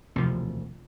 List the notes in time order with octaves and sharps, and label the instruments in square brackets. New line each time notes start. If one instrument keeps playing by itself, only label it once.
[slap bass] E1 D2 [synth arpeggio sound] C3 F3